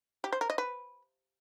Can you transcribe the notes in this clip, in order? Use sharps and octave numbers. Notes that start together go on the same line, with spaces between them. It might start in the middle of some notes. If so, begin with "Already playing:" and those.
G4
C5
A#4
D#5
B4